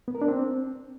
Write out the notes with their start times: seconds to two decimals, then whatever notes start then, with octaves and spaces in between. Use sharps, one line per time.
0.08 B3
0.15 A#4
0.22 D4
0.28 C4